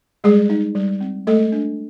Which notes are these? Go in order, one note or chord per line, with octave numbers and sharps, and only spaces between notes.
G3 G#3 G#4
D#4
G3
C4
G#3 A3 A4
D4